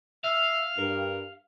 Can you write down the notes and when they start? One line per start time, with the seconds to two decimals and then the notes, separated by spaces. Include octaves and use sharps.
0.24 E5 F5
0.78 G2 A#4